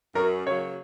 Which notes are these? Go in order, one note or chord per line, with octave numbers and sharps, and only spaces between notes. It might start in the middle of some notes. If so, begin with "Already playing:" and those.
F#2 A#4
C#3 F#3 A#3 C#5